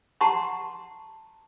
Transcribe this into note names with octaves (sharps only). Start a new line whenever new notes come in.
G4 F#5 A5 A#5 C6 C#6